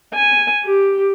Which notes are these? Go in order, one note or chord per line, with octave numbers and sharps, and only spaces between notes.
G#5
G4